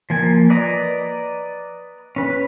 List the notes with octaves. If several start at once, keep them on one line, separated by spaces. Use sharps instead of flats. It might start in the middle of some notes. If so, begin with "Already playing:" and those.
F3 A#3 G#5
B4 D5 D#5 A#5
C#4 B4